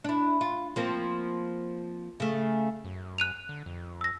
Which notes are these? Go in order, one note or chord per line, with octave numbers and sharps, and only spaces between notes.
D4 E4
F4
F3 A#3 C4
C#3 A3
F#2
F#6 D#7 F7
D3
F2
E6 A#6